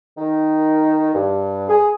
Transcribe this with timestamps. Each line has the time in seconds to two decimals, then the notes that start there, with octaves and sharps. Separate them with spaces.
0.18 D#3
1.14 G2
1.69 G#4